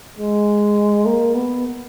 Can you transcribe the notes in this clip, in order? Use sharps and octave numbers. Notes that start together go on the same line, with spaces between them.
G#3
A#3
B3